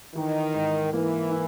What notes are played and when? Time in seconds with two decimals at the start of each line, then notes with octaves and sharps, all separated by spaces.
0.15 D#3 E3
0.54 G#2
0.93 E3 A#3
1.31 E4